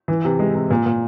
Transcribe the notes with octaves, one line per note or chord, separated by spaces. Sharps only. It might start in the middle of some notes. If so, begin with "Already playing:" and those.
E3
C3
G#3
C3
A#2
A#2